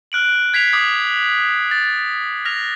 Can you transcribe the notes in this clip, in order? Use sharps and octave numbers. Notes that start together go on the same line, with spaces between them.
F6 F#6 D7 F#7
G#6 B6 C7 F7
D6 D#6 G#6
A6
F6 A#6 F7